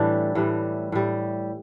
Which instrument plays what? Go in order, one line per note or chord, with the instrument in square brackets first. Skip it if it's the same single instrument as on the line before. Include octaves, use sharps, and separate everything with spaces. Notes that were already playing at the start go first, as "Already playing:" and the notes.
Already playing: [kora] A2 E3 G3 D4 A4
A2 E3 G3
A2 G3